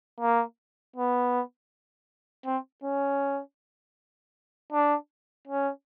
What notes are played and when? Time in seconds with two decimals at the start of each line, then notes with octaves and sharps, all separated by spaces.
0.21 A#3
0.96 B3
2.46 C4
2.84 C#4
4.72 D4
5.47 C#4